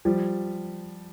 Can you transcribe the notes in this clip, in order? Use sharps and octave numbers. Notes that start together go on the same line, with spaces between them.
F3 G3